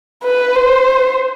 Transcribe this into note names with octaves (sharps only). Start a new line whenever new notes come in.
B4
C5